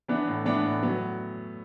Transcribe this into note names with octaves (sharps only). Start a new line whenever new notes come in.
E3 B3 D4
A2
E3 B3 D4
A2
F#3 B3